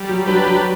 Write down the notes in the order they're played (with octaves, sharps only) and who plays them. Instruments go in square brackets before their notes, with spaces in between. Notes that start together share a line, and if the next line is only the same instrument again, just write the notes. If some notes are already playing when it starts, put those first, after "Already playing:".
Already playing: [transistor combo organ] G3
[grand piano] F#3
[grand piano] F#3 [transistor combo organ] D4 G4 B4
[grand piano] F#3